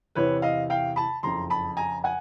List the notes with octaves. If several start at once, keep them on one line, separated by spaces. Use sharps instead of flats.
E2 C3 E3 B4 C#5
D#5 F5
F5 G5
A5 B5
F#1 F2 C#3 A#5 C6
A5 B5
G#5 A#5
F#5 G#5